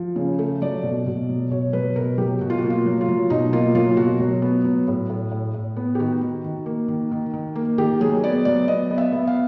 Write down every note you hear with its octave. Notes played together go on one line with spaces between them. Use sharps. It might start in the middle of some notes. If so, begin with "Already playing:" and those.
Already playing: F3
C#3
A3
F#3 D5
B2
B2
F#3
B2 C#5
F#3 B4
B2 A#4
F#3 G4
B2 F#4
F4
A#3 F#4
F4
F#3
F4
F#3
B2 D#4
A#3 F4
F#3 F4
B2 F#4
F#3
B3
F#3
A2
A2
A2
A2
B3
G4
D#3 F#4
D#3
D#3
A#3
D#3
D#3
D#3
A#3
D#3 G4
F#3 G#4
B3 D5
F#3 D5
B3 D#5
B3
E5
B3
F5